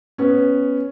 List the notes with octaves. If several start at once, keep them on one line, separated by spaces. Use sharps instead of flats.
B3 C#4